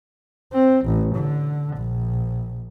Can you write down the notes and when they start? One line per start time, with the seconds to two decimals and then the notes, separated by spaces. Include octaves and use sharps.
0.53 C4
0.85 A1
1.15 D3
1.77 A#1